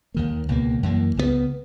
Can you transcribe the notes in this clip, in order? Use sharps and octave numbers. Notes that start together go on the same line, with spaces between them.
D#2 D#3 A#3
C#2 B2 A#3
F#2 E3 A#3
C#2 C#3 E3 B3